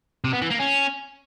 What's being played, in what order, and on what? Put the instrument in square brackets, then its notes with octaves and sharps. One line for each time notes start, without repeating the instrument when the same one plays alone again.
[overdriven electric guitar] C3
B3
E3
A#3
C#4